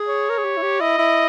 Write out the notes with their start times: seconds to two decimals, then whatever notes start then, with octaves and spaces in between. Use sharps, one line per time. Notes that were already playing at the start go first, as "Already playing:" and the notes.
Already playing: G#4
0.08 C#5
0.30 A#4
0.38 G#4
0.44 G4
0.57 E4
0.62 G4
0.80 E4 D#5
0.98 E4